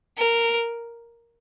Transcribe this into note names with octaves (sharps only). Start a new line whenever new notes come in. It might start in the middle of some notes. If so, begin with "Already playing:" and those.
A#4